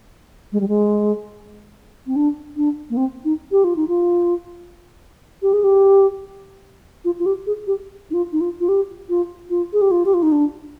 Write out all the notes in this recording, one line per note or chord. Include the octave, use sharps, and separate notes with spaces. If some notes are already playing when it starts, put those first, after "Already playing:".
G#3
G3
G#3
C4
D4
D4
A#3
C4
D#4
G4
F4
D#4
F4
G4
G#4
G4
F4
F4
G4
G#4
G4
D#4
F4
D#4
F4
F4
G4
F4
F4
G#4
G4
F4
G4
F4
D#4
D4